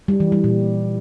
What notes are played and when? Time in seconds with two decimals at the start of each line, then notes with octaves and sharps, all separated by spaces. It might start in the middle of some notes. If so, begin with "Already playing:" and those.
0.08 G3
0.20 E3
0.32 G3
0.44 A#2